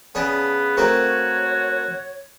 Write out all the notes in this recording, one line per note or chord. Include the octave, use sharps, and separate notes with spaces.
C#3 B3 D4 F#5
A3 A#3 C4 F#4 C#5